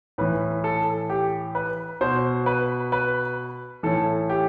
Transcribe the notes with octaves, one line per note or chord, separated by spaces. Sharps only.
A2 E3 B4
A4
G4
B4
B2 C5
B4
B4
A2 E3 A4
G4